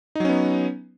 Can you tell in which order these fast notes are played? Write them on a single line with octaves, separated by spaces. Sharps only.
D#4 F#3 C#4 B3